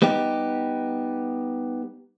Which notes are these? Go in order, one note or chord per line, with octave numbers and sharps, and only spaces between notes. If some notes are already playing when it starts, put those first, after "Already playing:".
G3 B3 D#4 G4